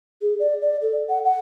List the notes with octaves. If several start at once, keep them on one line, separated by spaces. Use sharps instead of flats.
G#4
D5
D5
A4
F#5
F#5